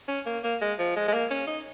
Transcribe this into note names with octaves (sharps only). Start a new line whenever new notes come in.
C#4
A#3
A#3
G#3
F3
G#3
G#3
A#3
C#4
D#4